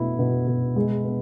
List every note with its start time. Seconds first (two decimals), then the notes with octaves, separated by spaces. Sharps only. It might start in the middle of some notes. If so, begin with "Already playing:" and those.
Already playing: B2 A3 E4
0.19 B2
0.47 B2
0.76 G#3
1.04 B3